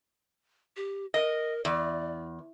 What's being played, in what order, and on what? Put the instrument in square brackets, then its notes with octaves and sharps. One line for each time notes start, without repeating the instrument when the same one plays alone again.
[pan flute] G4
[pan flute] A#4 [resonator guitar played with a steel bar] D#5
[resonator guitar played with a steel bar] E2 [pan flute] D5